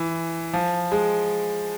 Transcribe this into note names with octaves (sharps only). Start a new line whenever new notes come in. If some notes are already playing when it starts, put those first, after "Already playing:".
Already playing: E3
F3
G#3